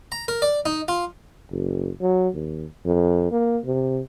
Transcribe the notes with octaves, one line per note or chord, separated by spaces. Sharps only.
A#5
A#4
D5
D#4
F4
F#1
F#3
D#2
F2
A#3
C3